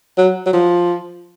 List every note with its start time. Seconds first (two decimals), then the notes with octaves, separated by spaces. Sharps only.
0.18 F#3
0.46 F#3
0.53 F3